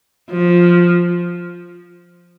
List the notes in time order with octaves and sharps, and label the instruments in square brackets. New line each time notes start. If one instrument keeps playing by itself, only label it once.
[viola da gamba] F3